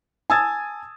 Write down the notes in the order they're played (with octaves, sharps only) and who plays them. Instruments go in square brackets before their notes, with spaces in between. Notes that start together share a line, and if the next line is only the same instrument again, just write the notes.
[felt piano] G#5 A5 D#6 E6 G#6 A6